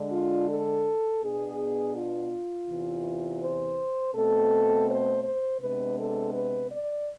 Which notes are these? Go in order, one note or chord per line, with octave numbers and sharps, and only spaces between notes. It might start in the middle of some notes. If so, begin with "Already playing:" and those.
Already playing: D3 G#3 D4
F4
A4
B2 B3 D4 G#4
F4
E2 C3 E3
C5
B2 A3 C4 A4
C5
C5
C3 G#3 B3 D4 B4
A4
B4
D5